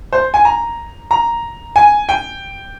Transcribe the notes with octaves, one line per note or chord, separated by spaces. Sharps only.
C5
G#5
A#5
A#5
G#5
G5